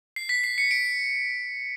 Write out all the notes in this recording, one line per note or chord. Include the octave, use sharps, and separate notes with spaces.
C7
B6
C7
C#7
D7